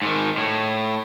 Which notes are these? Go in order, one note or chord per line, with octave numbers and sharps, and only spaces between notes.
G#2 D#3
A2